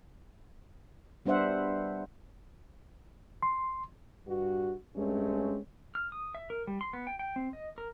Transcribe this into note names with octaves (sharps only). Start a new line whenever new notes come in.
G3 B3 D4 C5 E5 F#5
C6
G2 F#4
G2 G#3 A3 C4 C#4
F6
D#6
E5
A#4
G3
C6
B3
G5
G5
C4
D#5
A#4